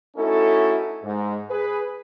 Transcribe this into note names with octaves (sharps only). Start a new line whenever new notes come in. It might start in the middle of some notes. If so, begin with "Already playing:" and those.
A3 C#4 D#4 E4 F#4 A4
G#2
G#4 B4